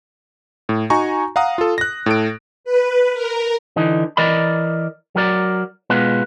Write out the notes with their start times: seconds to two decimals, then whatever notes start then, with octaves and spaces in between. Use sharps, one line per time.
0.69 A2
0.90 D#4 F#4 G#5 A#5 C#6
1.36 F5 F#5 A#5 D#6
1.58 F4 A4
1.78 F#6 A#6
2.06 A2 A4 D7
2.64 B4
3.14 A#4
3.76 D3 E3 D#4
4.17 E3 A#4 D5 D#5 B5
5.15 F#3 A#4 D5
5.90 B2 G#3 B3 F4 B4